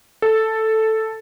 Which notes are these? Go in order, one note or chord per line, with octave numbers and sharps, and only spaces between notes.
A4